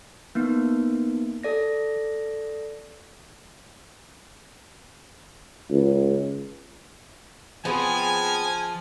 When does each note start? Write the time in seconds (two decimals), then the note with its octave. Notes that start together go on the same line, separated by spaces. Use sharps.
0.35 A#3 B3 D#4
1.43 A4 D5 A#6
5.71 C#2
7.65 F3 B3 C4 G#4 G#5